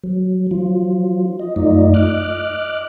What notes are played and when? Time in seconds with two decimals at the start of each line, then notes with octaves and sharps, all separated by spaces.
0.04 F#3
0.51 F3 F#3 F4
1.40 D#5
1.56 F#2 A3 D#4 F4 D5 D#5
1.94 D#5 D6 F6 F#6